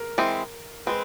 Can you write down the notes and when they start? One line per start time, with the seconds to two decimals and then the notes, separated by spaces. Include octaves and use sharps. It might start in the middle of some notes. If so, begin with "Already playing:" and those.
Already playing: A#4
0.18 E3 G#3 C4
0.86 G#3 C4 B4